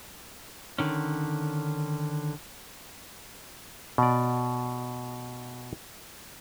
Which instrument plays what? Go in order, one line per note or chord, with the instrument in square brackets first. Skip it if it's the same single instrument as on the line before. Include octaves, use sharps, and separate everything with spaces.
[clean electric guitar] D3 D#3 C#4
[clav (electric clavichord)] B2 D5